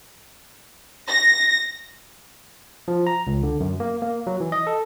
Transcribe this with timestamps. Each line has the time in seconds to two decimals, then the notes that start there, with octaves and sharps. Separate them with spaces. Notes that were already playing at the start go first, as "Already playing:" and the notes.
1.08 A#6
2.88 F3
3.07 A#5
3.27 C#2
3.43 D3
3.60 F#2
3.80 A#3
4.02 A#3
4.27 F#3
4.40 E3
4.52 D#5
4.67 A4